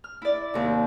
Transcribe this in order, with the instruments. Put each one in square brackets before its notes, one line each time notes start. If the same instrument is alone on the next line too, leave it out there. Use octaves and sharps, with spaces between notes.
[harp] F6
E4 D5
D#2 C3